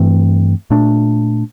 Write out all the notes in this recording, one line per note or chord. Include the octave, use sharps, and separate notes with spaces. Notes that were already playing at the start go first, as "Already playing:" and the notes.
Already playing: G2 E3 A3 C4
A#2 A3 D4